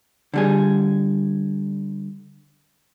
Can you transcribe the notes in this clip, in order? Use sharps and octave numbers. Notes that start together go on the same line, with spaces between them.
D3 G3 G#4